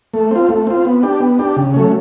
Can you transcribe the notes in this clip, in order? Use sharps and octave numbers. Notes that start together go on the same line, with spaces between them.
A3
C4 F4
A3
C4 F4
B3
D4 G4
B3
D4 G4
C#3
F#3 A3 C#4